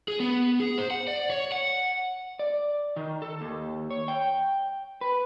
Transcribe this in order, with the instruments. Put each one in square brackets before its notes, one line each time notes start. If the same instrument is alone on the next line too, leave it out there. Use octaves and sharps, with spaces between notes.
[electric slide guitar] G#4
B3
G#4
C5
F#5
D5
C#5
F#5
[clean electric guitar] D5
D#3
A4
D#2
C#5
G5
B4